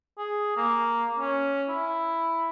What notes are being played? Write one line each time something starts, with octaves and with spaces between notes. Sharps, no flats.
G#4
A#3
C#4
E4